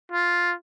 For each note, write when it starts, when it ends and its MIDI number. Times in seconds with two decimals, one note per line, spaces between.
0.12 0.54 65